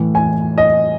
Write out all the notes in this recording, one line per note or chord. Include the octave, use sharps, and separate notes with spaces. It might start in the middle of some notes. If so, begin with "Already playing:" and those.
Already playing: A2 E3
G#5
D#5